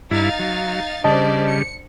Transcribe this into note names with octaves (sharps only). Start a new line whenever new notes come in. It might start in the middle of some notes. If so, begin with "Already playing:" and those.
G2 D#4 E4 F5 A6
F#3
C#3 G3 D4 C5 D5 D#5 A5
C#7